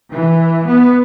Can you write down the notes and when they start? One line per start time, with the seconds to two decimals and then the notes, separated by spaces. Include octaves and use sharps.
0.13 E3
0.66 B3